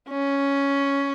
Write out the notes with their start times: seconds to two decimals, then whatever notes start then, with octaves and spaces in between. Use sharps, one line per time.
0.09 C#4